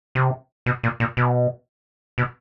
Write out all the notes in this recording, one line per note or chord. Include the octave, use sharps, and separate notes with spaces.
C3
B2
A#2
A#2
B2
B2